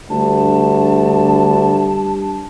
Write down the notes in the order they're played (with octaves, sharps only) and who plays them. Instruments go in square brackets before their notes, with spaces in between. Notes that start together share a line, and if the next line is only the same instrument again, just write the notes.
[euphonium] D2 [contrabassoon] G2 [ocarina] A5